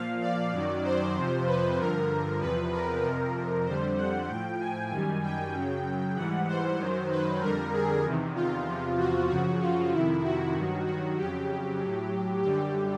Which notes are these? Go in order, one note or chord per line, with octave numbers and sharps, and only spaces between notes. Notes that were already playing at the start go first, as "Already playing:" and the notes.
Already playing: A#2 F3 F5
D5
F#2 D#3 F#3
C5
F2 C3 F3
B4
G2 D3 F3 A#4
E2 C3 F3 B4
A#4
F2 C3 F3 A#4
F2 D3 G3 C5
F#5
A2 F3 G5
G#5
F#2 D#3 G3 G#5
G5
F#2 C#3 F#3
G#2 E3 G3 F#5
C5
F#2 D#3 F#3
B4
F2 D3 G3 A#4
G#4
E2 C3 D#3
F4
E2 C3 F3
F#4
F#2 C#3 F3 F#4
F4
F2 C3 D#3 E4
F#4
G2 D#3 F#3
F#4
F2 C#3 F#3 G4
A2 F#3
F#2 D3 G3 G4